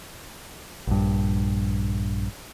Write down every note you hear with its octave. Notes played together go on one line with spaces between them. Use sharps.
A#1 G2